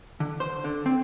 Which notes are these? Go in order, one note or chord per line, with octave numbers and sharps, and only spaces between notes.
D3
C5
D3
C4